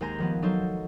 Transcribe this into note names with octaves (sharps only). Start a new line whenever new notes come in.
D#2 G#3 C5 G#5 A#5 A#6
D#3 F3 B3
F#3 D#4 A4 C5